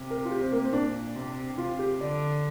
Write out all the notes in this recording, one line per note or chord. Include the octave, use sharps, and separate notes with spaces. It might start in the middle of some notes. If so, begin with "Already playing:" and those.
Already playing: C3
A#4
F4
G4
C4
A#3
C4
A#2 D4
C3
C3 F4
G4
D3 D5